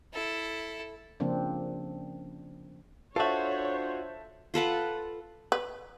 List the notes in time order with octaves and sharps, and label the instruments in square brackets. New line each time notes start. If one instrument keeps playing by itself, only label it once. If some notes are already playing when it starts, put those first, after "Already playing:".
[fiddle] E4 A4
[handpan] C#3 F3 A#3 C4 D4
[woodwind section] D4 C5 [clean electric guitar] F4 F#4 [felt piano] A4 E5 [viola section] C#5
[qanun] F4 A4 B4 F#5
[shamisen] B4